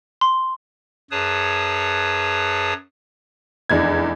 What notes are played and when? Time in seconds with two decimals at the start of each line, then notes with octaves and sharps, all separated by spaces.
0.21 C6
1.11 F#2 G#4 B4 C#5 A5 D#6
3.69 F1 E2 D4 G#6